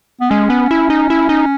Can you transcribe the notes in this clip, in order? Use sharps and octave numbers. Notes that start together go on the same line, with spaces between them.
B3
G#3 C#4
B3
E4
D#4
E4
D#4